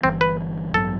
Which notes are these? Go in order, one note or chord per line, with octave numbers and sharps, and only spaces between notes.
G1 G2 E3 G3 C4
B4
A1 G2 F#3 B3 A4